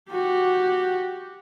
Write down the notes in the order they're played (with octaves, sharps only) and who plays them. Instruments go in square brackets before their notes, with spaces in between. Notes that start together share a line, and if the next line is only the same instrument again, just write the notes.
[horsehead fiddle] F#4 G4